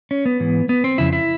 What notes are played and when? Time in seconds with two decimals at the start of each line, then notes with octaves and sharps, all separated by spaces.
0.11 C#4
0.26 B3
0.40 G#2 E3
0.69 B3
0.84 C4
0.98 F2 C#3 E4
1.13 E4